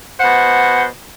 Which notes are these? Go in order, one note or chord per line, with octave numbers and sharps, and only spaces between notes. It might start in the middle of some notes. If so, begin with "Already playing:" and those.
B2 C5 F#5